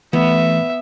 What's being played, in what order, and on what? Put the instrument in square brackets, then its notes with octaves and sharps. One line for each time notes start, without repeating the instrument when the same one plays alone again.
[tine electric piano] E3 A3 [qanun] B3 [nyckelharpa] E5